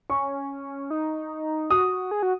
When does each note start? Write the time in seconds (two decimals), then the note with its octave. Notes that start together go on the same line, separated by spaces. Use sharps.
0.10 C#4 C#6
0.90 D#4
1.71 F#4 D#6
2.11 G#4
2.23 F#4